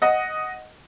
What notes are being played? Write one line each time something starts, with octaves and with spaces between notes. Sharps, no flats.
D#5 F#5